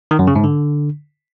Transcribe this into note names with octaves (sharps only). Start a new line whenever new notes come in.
D#3
F#2
C#3
G#2
D3